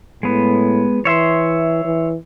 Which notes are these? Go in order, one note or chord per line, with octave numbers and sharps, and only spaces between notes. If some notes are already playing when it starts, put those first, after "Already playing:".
A2 G#3 B3
E3 C#5 E5 C6
E3